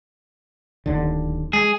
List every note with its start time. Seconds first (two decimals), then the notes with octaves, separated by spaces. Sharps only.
0.86 D1 D#2 D3
1.53 G#3 G#4